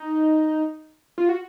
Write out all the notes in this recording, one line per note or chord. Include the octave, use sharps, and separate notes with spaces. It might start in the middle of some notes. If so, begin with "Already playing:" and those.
Already playing: D#4
F4
F#4